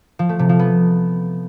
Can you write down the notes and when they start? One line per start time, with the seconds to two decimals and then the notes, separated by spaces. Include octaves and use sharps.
0.19 F3
0.29 A3
0.39 C3
0.49 F3
0.59 B3